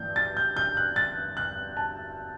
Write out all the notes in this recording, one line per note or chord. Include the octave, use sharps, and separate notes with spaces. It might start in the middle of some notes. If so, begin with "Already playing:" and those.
Already playing: G2 E3 A3 G6
A6
G6
G6
F#6
A6
F#6
A5